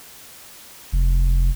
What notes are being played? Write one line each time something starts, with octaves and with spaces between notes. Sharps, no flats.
F1